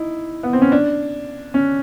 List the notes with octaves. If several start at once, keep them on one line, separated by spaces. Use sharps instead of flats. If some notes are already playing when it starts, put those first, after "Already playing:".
Already playing: D#4 E4
B3
C4
C#4
D4
C#4